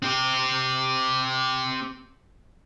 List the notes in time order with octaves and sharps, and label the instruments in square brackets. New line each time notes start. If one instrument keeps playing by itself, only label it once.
[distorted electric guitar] C4 G4